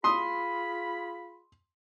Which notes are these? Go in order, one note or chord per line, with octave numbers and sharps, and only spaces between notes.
F4 G#4 B5 C6 D#6